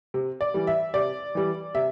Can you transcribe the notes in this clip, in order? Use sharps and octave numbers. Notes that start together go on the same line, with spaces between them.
C3
D5
E3 G3
E5
C3 D5
E3 G3
C3 E5